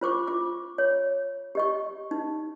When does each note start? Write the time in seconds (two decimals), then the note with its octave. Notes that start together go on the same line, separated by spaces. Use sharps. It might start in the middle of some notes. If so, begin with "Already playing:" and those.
0.01 F4 C5 C#6 D6
0.27 F4 D6
0.78 C#5
1.55 G4 D#5 C#6
2.11 D#4